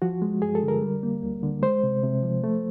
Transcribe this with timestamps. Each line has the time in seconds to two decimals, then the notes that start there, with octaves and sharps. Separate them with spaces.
0.02 F3 F#4
0.22 G#3
0.42 G2 G#4
0.55 A4
0.63 D3
0.68 A#4
0.82 G3
1.03 A#3
1.23 D2
1.43 D3
1.63 G#3 C5
1.83 C3
2.03 C3
2.23 F3
2.44 A3